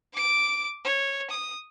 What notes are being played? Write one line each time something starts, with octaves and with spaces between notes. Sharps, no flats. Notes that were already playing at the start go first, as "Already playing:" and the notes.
D6 D7
C#5
D#6